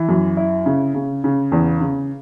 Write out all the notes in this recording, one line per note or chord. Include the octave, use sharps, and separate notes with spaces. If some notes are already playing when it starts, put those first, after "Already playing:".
Already playing: E3
F#2
E4
C#3
C#3
C#3
E2
C#3